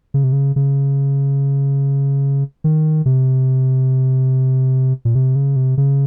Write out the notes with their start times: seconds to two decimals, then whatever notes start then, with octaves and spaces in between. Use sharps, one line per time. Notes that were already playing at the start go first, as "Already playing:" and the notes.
0.14 C#3
0.24 C3
0.32 C#3
0.56 C#3
2.64 D#3
3.06 C3
5.05 A#2
5.15 C3
5.36 C#3
5.56 C3
5.77 C#3